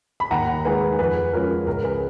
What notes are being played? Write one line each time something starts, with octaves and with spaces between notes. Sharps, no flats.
B5
D#2 F#5 A#5
D#3 G#3 D#4 G#4 B4
F2 G#4 B4
F3 G#3 C#4 F4 A#4
C#2 A#4
G#4 B4